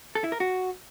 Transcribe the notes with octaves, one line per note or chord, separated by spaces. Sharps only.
A4
E4
A#4
F#4